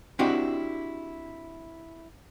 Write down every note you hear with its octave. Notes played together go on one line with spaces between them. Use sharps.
C4 D4 E4 F#4 G4 D#5